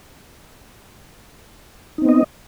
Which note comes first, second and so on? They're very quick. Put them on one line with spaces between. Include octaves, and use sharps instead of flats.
D#4 C4 B3 D#5